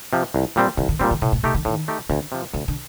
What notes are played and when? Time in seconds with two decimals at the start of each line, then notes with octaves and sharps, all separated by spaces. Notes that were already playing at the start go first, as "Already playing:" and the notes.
0.13 C3 F3
0.34 C2
0.56 A#2 G3 C4
0.77 C2 D3
0.89 D3
0.99 A#2 D#3 G3 C4
1.11 D3
1.22 A2 C3
1.32 A#2
1.43 C3 A3 D#4 G4
1.54 D3
1.65 A2 D#3
1.88 A3 D#4 G4
2.09 D2 D3
2.32 C3 F3
2.54 D2 D3
2.68 D3